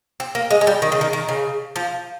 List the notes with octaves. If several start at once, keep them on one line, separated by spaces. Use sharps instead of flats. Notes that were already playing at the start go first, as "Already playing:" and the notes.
C4
A#3
G#3
G#3
G3
D#3
C#3
D#3
D#3
C#3
F3